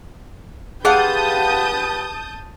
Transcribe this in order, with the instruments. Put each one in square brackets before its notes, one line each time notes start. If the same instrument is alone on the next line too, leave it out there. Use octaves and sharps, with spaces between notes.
[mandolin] F4 F#5 [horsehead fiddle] G4 B4 [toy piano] G#4 [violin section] A5 D#6 G6